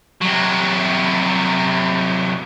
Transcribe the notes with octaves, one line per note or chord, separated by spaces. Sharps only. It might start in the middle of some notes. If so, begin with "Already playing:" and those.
C3 F#3